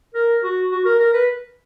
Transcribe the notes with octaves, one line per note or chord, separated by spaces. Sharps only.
A#4
F#4
F#4
A#4
A#4
B4